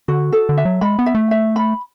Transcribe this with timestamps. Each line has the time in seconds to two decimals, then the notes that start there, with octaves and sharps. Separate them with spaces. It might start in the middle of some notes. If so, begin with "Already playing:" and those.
0.08 D3 F#4
0.32 A4
0.49 D3
0.57 E5
0.65 F#3
0.81 G#3 B5
0.99 B3
1.06 E5
1.15 A3
1.31 E5
1.56 B5